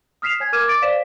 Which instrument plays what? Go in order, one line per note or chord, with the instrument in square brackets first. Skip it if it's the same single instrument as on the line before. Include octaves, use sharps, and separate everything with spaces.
[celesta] D#6 F6 B6 C7 E7 F7
C#5 G#5 G#6
A#4 D6 F6 G#6 D#7 E7
D6 A6 D7
B4 C5 D5 F5 B6 E7